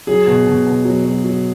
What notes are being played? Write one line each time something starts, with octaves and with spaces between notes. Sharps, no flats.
F#3 G#4
B2
B2
B2
F#3
F#3
F#3